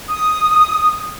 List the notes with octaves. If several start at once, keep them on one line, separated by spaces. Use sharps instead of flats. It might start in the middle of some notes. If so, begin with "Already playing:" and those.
D#6